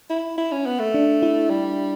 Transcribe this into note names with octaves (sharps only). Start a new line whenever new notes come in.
E4
E4
C#4
B3
A3
D4
E4
G3